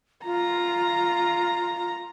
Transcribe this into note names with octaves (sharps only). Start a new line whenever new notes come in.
F4 A#5